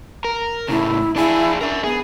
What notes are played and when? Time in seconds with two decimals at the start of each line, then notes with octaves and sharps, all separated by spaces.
0.25 A#4
0.68 A2 C#3 E4
1.16 D4 E4 G#4
1.61 D4 A#4 E5
1.84 B3 G#4